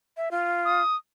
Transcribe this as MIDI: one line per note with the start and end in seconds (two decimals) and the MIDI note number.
0.17 0.29 76
0.31 0.82 65
0.65 0.96 87